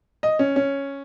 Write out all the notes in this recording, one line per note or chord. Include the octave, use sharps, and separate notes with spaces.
D#5
C#4
C#4